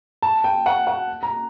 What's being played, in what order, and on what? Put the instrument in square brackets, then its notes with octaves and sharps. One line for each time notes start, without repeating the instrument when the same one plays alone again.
[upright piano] A5
G5
F#5
F#5
A#5